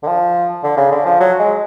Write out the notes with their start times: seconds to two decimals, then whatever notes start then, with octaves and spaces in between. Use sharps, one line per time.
0.03 D3
0.08 F3
0.64 D3
0.77 C#3
0.92 D3
1.06 F3
1.20 F#3
1.39 G#3